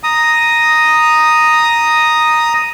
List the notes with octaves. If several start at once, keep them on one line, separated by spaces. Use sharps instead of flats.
A#5 D#6